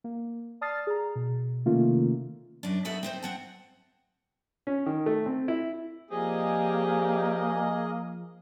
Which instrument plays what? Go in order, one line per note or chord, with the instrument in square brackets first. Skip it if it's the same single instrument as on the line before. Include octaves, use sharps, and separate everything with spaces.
[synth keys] A#3
D5 A5 D#6 F6 A6 C7
G#4 A#5
B2
C3 D#3 A3 A#3 C#4 F4
[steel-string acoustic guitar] F#2 D4
B3 D#4 F#4 A4 E5
C4 D#4 C5
C4 F#5 A5
[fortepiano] C#4
D#3
A3
C4
E4
[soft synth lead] F3 [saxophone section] G3 C4 G4 [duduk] A#3 [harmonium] G#4 D#5